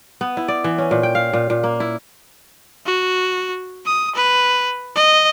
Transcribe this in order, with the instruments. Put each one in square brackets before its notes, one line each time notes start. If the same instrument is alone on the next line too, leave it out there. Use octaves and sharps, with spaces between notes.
[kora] B3
E4
D5
E3
C#4
A#2
G5
F5
A#2
A#2
A#3
E4
[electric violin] F#4
D#6
B4
D#5